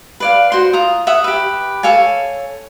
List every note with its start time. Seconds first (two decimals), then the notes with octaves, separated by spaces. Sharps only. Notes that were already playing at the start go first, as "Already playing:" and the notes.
0.20 B4 D5 F5
0.52 F#4 C5 C6
0.73 F4 A#5 D#6
1.07 E5 F#5 D#6
1.24 G4 B4
1.83 A4 C#5 F5 G#5